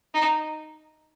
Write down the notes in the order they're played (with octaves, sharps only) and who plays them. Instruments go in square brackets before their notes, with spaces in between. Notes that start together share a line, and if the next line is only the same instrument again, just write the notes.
[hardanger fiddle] D#4